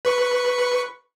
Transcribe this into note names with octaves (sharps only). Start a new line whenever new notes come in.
B4 C#6 C#7